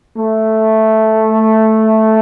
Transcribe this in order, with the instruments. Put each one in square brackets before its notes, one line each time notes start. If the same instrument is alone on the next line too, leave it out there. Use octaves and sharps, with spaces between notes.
[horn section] A3